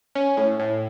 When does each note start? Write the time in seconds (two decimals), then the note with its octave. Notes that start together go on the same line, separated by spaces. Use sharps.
0.15 C#4
0.37 A2
0.59 A2